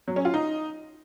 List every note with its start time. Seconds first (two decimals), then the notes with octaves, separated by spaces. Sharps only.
0.08 F#3
0.16 C#4
0.25 F4
0.34 D#4